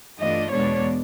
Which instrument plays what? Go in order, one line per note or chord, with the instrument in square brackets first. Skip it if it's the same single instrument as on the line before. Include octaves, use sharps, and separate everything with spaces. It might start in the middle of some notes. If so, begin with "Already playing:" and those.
[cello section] G2 E3 A3 D4 F4 [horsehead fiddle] D#5
[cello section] E2 B2 G#3 B3 D4 [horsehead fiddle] C#5